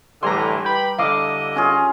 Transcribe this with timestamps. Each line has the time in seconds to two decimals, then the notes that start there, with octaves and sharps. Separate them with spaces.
0.23 A2 D3 E3 G3 A#5 C6
0.65 B4 G5 B5
0.98 D3 E4 D#5 F5 D6
1.56 C#4 F4 G#4